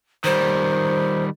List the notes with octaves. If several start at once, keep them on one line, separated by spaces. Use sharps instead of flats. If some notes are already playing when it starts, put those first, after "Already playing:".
D#3 G3 C5